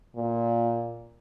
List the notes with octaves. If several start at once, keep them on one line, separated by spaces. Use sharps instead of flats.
A#2